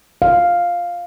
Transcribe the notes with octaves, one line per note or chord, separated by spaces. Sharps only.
F5